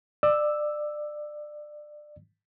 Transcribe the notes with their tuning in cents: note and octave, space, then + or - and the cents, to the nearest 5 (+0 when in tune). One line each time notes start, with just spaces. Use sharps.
D5 +25 E6 +0